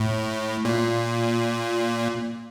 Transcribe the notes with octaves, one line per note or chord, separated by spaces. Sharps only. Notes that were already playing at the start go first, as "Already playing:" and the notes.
Already playing: A2
A#2